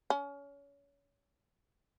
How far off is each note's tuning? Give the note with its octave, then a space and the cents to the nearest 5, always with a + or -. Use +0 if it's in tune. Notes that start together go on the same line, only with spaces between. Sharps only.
C#4 +30